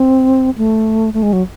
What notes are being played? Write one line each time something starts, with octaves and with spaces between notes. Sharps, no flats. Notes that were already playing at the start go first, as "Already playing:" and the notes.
Already playing: C4
A3
A3
G#3
F#3